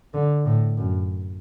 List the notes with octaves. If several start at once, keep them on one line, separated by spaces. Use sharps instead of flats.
D3
A2
F#2